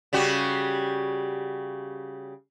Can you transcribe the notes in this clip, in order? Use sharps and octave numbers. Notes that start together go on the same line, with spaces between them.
C#3 G3 F#4